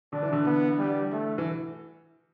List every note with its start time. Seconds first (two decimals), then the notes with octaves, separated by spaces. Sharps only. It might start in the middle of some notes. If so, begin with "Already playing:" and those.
0.13 D3 D4
0.22 E3
0.33 D3
0.46 B3
0.79 G3
1.12 A3
1.38 E3